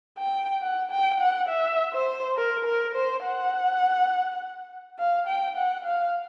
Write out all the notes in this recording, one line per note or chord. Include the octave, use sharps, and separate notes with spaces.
G5
F#5
G5
F#5
E5
C5
A#4
A#4
C5
F#5
F5
G5
F#5
F5